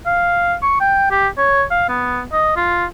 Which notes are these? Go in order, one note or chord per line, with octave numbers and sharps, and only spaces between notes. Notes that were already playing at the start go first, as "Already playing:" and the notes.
F5
C#6
G5
G4
C#5
F5
B3
D#5
F4